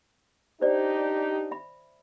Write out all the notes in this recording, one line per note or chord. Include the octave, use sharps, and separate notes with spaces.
D4 D#4 G4 C5 D5
E5 B5